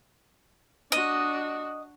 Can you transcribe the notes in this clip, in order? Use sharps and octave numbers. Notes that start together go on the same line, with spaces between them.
D4 F#4 D#5